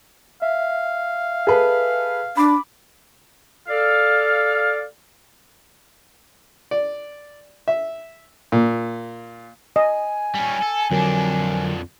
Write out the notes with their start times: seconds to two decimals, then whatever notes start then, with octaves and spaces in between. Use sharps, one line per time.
0.42 E5 F5
1.47 G#4 A4 B4
2.37 D4 B5 D6
3.68 A4 D5 F5
6.71 D5
7.68 E5
8.52 A#2
9.76 D#5 G#5
10.35 G3 C#4
10.62 A4
10.91 F2 D3 F#3 D4 A#4